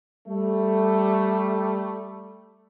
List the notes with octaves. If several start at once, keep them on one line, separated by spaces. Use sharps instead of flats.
G3 A3